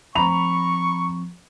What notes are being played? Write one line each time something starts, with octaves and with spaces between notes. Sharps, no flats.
F3 C4 A#5 B5 C#6 F7